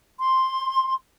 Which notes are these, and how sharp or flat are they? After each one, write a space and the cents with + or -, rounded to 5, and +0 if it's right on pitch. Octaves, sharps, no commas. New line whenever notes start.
C6 +5